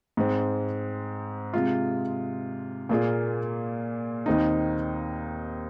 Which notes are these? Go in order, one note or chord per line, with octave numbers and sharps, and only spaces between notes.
G#2 G#3 C4
C3 G#3 F4
A#2 A#3 F4 G#4
D#2 D#3 C4 D#4